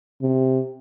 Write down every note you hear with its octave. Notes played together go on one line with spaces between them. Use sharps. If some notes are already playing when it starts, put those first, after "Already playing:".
C3